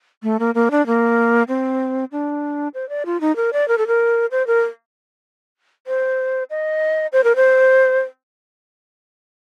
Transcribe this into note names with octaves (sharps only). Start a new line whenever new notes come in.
A3
A#3
A#3
D4
A#3
C4
D4
C5
D5
F4
D#4
A#4
D5
A#4
A4
A#4
C5
A#4
C5
D#5
C5
A#4
C5